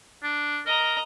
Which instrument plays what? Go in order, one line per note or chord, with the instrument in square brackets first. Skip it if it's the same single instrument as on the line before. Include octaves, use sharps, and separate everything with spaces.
[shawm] D4
[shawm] A#4 [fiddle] D#5 A#5